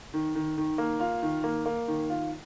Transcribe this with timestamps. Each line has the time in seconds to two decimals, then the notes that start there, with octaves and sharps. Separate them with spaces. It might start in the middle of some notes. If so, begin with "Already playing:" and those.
0.14 D#3
0.35 D#3
0.58 D#3
0.78 A#3
1.00 F4
1.22 D#3
1.44 A#3
1.66 A#3
1.88 D#3
2.10 F4